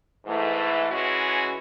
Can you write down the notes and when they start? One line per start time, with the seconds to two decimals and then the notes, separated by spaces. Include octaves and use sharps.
0.25 G#2 E3 A3
0.89 E3 G#3 C#4 F#4